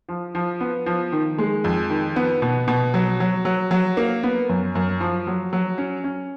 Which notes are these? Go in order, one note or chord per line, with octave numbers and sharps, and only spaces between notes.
F3
F3
B3
F3
D#3
G#3
F2
D#3
B3
B2
B2
F#3
F#3
F#3
F#3
A#3
B3
F#2
F#2
F3
F#3
F#3
C#4
C#4